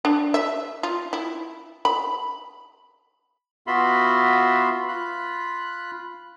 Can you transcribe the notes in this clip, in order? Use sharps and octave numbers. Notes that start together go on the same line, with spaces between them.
D4
E5
F4
E4
B5
B3 F4 F#4 E5 B5 C6
F4 B5 F#6